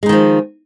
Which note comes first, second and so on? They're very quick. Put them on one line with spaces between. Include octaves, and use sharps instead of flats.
G#3 D#4 D#3 F3